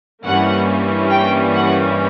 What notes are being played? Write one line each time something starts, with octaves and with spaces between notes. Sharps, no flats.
G2 E3 G3 A#3 C#4 F#5
G5
F#5